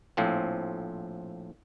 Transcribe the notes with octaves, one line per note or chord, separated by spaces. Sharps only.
A#1 A2 F3 C4